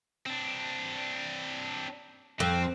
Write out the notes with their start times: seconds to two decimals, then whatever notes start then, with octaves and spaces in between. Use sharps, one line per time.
0.26 C4 D4
2.40 F2 C4